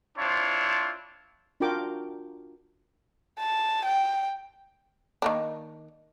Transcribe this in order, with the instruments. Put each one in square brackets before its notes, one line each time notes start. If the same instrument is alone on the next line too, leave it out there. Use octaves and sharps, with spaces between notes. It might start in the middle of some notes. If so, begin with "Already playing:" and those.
[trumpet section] C4 D4 E4 F4 C5 C#5
[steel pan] D4 F4 F#4 A#4 G5 D6
[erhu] A5
G5
[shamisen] D#3 A#3 D4